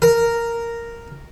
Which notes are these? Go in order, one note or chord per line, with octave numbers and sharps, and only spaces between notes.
A#4